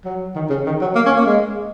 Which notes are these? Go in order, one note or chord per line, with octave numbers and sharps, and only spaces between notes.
F#3
D#3
C#3
D#3
F#3
A#3
C#4
A#3
G#3